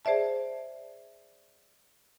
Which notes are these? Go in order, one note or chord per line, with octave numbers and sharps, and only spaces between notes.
G#4 C5 D5 E5 A5